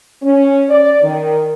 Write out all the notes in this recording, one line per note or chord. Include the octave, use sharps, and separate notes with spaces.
C#4
D5
D#3